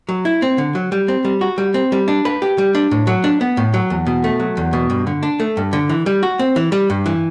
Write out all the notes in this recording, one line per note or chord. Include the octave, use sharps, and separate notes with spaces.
F#3
E4
C4
D3
F#3
G3
C4
G3
F#4
G3
C4
G3
D4
B4
G4
G3
D4
A2
F#3
D4
B3
A2
F#3
E2
B2
A3
F#3
E2
B2
G2
D3
D4
A3
G2
D3
E3
G3
F#4
C4
E3
G3
G2
E3